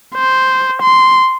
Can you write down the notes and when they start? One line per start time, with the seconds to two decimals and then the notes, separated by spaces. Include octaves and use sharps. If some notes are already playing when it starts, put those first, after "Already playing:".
0.15 C5
0.82 C6